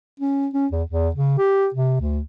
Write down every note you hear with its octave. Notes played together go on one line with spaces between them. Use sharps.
C#4
C#4
E2
E2
C#3
G4
C3
D2